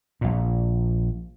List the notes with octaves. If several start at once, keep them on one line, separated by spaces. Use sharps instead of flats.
A#1 A#2